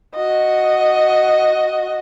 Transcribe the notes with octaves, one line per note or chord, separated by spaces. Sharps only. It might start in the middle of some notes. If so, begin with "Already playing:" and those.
F#4 D#5